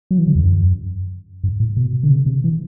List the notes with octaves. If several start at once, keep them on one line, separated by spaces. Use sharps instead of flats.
F#3
E3
D3
E2
F#2
G2
A2
B2
D3
C3
C3
E3